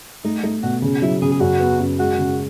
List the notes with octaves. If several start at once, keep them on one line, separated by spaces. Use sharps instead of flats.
A3 D#4
A3 D#4
B2 F#4
C#3
F#3 E4
C#3 G#4
G#4
F#2 F#4
B3
F#2
G#3 F#4
C#3